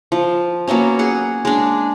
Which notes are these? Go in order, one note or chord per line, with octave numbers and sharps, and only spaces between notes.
F3
F#3 A#3 B3 C#4
G#4 F#5
G#3 D4